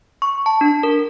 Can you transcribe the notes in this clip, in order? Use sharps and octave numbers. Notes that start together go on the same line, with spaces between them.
C#6
A5
D4
A#4